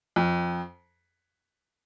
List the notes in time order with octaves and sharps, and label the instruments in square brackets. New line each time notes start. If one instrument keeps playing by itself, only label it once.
[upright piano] F2